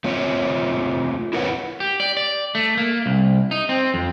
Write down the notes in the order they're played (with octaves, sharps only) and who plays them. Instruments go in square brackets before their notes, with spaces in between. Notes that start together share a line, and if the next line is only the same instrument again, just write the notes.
[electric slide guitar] A3 C4 F4 C#5
E4 A#4 B4 C#5 F#5
[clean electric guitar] G4
D5
D5
A3
A#3
C2
D#4
C4
F2